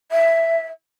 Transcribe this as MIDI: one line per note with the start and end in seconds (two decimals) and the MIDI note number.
0.12 0.66 76